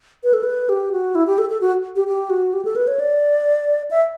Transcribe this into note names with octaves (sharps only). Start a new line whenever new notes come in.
B4
A4
B4
G4
F#4
E4
G4
A4
A4
F#4
G4
G4
F#4
G4
A4
B4
C#5
D5
E5